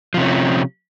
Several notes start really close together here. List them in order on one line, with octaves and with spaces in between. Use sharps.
F3 C3 C#4